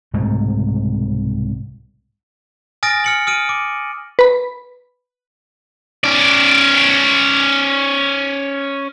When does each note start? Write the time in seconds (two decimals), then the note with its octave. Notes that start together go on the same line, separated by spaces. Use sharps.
0.14 C2 G#2 B2 A3
2.83 G#5 D#6 F6 A6 A#6 D7
3.04 F6 C#7 F#7
3.27 D#6 F6 D7 D#7
3.49 D6
4.19 B4 B5
6.04 C#4 D5